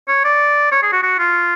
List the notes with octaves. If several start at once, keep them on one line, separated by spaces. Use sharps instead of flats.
C#5
D5
C#5
G#4
F#4
F#4
F4